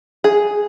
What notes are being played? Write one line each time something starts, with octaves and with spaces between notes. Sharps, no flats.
G#4